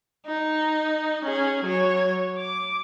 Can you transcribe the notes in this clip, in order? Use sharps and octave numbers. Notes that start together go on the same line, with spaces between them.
D#4
C#4 G#4
F#3 C#5
D6